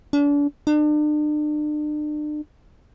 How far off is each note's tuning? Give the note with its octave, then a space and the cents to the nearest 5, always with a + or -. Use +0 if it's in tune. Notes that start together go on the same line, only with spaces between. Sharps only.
D4 -35
D4 +40